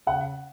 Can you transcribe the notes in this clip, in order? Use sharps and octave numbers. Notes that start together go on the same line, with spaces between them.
C#3 F#5